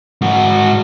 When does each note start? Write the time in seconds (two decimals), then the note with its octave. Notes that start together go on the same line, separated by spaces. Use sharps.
0.21 G#2 F#4